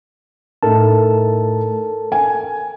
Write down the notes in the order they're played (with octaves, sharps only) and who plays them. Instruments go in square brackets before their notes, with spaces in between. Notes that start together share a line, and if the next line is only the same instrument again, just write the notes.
[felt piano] A2 D#4 [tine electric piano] A4 A#4 A5
[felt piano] G#5